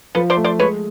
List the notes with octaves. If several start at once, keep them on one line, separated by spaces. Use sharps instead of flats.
F3 A4 B4
C5 D5
A3
C5 D5
G#3 B4 C#5